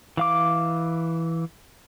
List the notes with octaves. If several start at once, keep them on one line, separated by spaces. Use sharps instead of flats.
E3 F5 D6